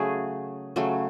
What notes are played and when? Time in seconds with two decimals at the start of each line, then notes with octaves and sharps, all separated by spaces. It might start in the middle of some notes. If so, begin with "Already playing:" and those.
Already playing: C#3 F#3 A3 G#4
0.76 C#3 F#3 A3